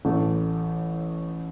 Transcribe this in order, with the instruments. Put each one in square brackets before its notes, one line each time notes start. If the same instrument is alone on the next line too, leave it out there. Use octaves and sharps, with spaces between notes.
[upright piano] A1 A2 A3